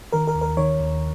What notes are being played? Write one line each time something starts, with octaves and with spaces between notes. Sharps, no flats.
D#3 A#4
A#4
D#2
A#4
D#3 C#5
D#2